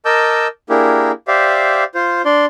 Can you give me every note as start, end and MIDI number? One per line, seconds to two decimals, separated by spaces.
0.05 0.47 70
0.05 0.47 75
0.05 0.47 81
0.05 0.47 86
0.05 0.47 88
0.05 0.47 91
0.70 1.12 58
0.70 1.12 62
0.70 1.12 64
0.70 1.12 67
0.70 1.12 68
0.70 1.12 70
1.28 1.84 67
1.28 1.84 72
1.28 1.84 74
1.28 1.84 76
1.28 1.84 77
1.95 2.22 65
1.95 2.22 72
2.25 2.46 62
2.25 2.46 74
2.25 2.46 84